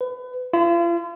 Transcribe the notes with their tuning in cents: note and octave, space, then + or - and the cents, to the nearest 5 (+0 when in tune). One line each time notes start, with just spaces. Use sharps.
B4 +30
F4 -40